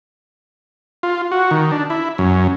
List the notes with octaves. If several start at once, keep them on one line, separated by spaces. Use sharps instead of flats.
F4
F#4
D#3
D4
E4
F#2